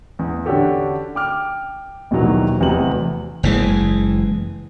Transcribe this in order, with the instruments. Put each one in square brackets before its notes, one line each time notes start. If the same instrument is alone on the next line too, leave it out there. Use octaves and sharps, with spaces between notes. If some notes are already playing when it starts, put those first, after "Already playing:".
[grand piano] E2
D3 C#4 D4 F#4 G4 A4
G5 D6 F6
A#1 D#2 B2 D#3 E3 F#3
F1 E2 C3 F#3 B4 F#7
[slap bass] F#1 E3 G#3